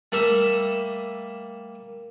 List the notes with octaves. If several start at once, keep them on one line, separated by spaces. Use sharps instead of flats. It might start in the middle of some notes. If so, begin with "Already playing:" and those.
G3 A3 A#3 E5